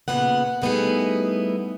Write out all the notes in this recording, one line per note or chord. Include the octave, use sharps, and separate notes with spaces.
A#2 C#3 B3 F#5
G3 A3 B3 D#4 E4 G#4